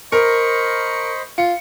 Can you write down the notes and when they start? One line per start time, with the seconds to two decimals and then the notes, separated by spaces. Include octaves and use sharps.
0.12 A#4 C5 D#5 B5 C#6
1.38 F4 C#7